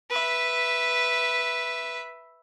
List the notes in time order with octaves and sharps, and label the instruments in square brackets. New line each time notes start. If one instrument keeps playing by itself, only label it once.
[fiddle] B4 E5